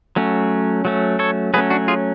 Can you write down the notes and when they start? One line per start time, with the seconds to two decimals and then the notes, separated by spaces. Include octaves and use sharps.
0.16 F#3 A3 C#4
0.85 F#3 A3 C#4
1.19 A4 C#5
1.54 F#3 A3 C#4 G#4 B4
1.70 D4 F#4
1.88 F4 G#4